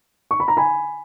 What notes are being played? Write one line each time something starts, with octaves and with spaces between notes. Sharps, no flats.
C#6
B5
A#5
G#5 B5